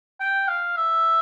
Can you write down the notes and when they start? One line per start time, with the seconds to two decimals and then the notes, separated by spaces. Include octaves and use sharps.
0.20 G5
0.48 F5
0.77 E5